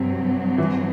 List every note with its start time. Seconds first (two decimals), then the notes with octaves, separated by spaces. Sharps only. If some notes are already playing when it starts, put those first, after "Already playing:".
Already playing: G2 C3 F#3 C4
0.58 E3